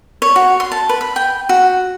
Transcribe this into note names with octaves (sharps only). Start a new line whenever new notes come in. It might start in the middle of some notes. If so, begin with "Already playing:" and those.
C#5
F#4
C6
A5
B4
B5
G5
F#4